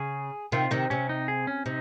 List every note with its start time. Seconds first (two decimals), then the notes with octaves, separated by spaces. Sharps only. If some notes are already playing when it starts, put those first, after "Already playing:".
Already playing: C#3 G#4
0.52 C3 D#3 F4
0.71 C3 D#3 D#4
0.90 C3 C#4
1.09 D#4
1.28 G#4
1.47 C#4
1.66 C3 D#4